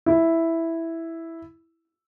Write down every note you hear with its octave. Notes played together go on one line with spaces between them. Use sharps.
E4